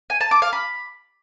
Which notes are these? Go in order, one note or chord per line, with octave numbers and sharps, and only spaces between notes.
G#5
A5
D6
F5
B5